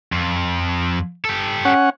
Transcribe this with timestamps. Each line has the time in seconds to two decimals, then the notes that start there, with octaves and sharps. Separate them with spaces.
0.12 F2
1.25 G4 A4
1.65 C#4 F#5